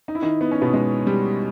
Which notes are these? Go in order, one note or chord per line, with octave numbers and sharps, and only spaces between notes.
D#4
E4
D#3 D#4
B3
C#4
B2 B3
G#3
G3